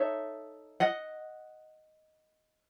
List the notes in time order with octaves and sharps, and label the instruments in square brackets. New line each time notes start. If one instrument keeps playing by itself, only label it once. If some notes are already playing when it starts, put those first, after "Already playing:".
Already playing: [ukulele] D#4 A4 C#5 E5
D#5 F#5